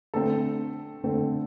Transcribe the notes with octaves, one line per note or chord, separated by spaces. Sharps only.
D3 A3 C4 A4
D3 A3 C4